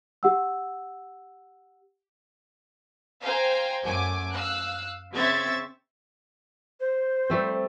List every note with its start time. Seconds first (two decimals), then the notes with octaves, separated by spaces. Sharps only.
0.23 G4 F#5 E6
3.22 C5 F5 G5 G#5 A#5
3.83 F#2 A3 G#5 D6
4.34 F5 E6 F#6
5.13 C#3 C4 E5 C#6 G#6 A6
6.80 C5
7.30 G3 A3 C4